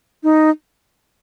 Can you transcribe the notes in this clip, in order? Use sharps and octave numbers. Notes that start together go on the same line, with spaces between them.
D#4